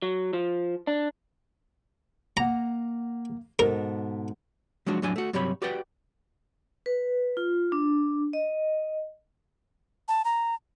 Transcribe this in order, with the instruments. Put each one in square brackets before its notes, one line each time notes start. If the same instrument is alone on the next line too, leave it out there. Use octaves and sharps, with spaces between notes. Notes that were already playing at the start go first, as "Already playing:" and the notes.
[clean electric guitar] F#3
F3
D4
[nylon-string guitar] A#3 F#5 [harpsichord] A#5
[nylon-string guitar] G#2 B2 A4 [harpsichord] A#4
[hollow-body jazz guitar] F3 F#3 G#3 D4 F#4
F2 A2 F#3 D4 G#5
A3 F#4
G2 C3 F#3 G4 C#5 B5
F#4 G4 B4 D5 F#5 G5
[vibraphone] B4
F4
D4
D#5
[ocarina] A5
A#5